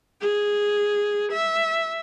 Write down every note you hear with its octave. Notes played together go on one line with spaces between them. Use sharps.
G#4
E5